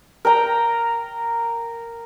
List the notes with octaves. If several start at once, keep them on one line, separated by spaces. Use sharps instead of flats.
A#4 G5 A#5